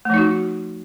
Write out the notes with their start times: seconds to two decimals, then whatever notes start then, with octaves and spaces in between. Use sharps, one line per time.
0.05 A3
0.10 F3
0.14 D#4
0.18 F#4